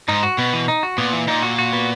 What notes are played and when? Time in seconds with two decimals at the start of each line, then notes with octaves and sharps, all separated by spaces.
0.08 G#2 D#4
0.23 F#4
0.38 B2 B3
0.53 E3
0.68 D#4
0.83 F#4
0.98 A#2 B3
1.13 E3
1.28 A#2 D#4
1.42 F#4
1.58 F#4
1.73 B3